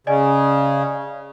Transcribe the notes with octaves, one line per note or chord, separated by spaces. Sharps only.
C#3 D5 D#5 G#5